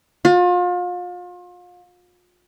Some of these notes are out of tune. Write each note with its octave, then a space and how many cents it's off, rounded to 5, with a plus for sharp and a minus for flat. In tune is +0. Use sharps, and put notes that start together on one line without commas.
F4 +35